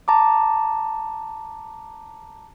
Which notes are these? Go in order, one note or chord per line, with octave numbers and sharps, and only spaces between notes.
A5 A#5 D6